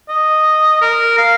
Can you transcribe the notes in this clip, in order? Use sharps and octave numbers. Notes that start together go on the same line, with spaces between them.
D#5
A#4
F5